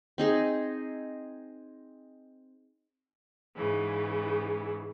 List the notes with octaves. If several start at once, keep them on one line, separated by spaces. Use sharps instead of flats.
C4 D#4 G#4
G#2 C#3 E3